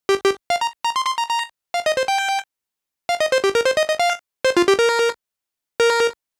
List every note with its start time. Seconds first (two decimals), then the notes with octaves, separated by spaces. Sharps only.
0.09 G4
0.25 G4
0.50 F5
0.61 A#5
0.84 A#5
0.96 C6
1.06 C6
1.18 A#5
1.29 A#5
1.74 F5
1.86 D#5
1.97 C5
2.08 G5
3.09 F5
3.20 D#5
3.32 C5
3.44 G4
3.55 A#4
3.65 C5
3.77 D#5
3.88 D#5
3.99 F5
4.45 C5
4.57 F4
4.68 G4
4.79 A#4
5.80 A#4